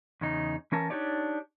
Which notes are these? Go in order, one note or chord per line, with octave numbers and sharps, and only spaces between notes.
E2 C#3 D#4
E3 C#4 A#4 A5
D4 D#4 G4 C#5 D5